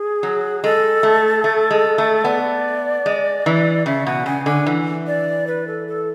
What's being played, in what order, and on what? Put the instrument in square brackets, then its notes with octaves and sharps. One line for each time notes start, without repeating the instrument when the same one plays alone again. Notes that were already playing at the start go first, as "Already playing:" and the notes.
Already playing: [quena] G#4
[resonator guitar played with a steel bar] F#3
[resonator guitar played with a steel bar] G#3 [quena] A4
[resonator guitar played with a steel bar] A3
A3
G#3
A3
[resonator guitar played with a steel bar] B3 [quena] D5
[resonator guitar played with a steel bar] G#3
E3
[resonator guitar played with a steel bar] C#3 [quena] E5
[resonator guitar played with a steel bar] B2 [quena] F#5
[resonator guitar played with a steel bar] C#3 [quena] G#5
[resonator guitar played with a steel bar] D3 [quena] G#5
[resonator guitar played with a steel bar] E3
[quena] D5
B4
A4
A4